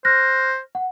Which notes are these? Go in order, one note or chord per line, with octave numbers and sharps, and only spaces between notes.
C5 F6 F#6 A#6
F#5